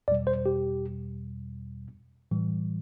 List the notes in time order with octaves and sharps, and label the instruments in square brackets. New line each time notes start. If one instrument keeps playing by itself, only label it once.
[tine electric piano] E2 B2 G3 D5
C5
G4
A2 E3 G3